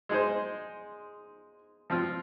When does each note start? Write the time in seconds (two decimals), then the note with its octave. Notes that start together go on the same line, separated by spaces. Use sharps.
0.09 G#3 D#4 G#4 C5
1.90 F3 C4 F4